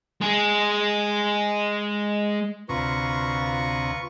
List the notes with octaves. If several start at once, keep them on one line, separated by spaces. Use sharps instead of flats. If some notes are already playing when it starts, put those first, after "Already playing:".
G#3 G#4
D2 C3 F4 B4 A#5 C#6